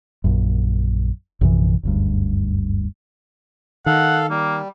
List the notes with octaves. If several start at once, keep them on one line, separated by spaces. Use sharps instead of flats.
A#1 F#2
A#1 F#2 C3 E3
F#1 D2 G2
D#3 A4 F5 F#5
G3 A#3